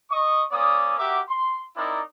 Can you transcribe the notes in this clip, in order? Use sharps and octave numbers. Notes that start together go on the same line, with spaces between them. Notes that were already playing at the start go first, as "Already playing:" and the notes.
D#5 C#6 D#6
A#3 C#4 D5 D6 D#6
F#4 G4 A#4 E5 F#5 D6
C6
C4 D#4 E4 A#4 D5